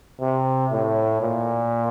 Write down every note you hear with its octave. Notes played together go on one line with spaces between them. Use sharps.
C3
A2
A#2